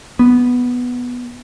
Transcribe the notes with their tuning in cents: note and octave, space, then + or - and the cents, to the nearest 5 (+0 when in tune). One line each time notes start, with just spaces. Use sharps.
B3 -5